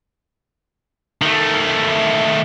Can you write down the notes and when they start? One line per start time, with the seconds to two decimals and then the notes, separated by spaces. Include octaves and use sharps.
1.22 D#3 A3